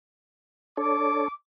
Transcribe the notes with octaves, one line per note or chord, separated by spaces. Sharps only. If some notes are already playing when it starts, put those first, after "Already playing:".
D4 A4 C#5 D6